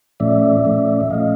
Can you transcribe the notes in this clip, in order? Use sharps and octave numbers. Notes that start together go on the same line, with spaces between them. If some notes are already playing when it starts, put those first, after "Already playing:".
A#2 F3 A3 C#4 D5 E5
A#2 F3 A3 C#4
E5
A#2 F3 A3 C#4 D#5 F5